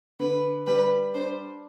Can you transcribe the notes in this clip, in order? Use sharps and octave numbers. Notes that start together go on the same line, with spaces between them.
D3 B4
G3 B4
D4 C5